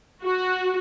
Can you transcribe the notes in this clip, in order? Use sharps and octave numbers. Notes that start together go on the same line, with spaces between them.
F#4